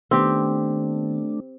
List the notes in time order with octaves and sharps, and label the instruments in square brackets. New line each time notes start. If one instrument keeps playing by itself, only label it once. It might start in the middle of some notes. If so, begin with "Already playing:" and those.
[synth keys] D#3 B3 [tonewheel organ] A3 D4 [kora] C4 G4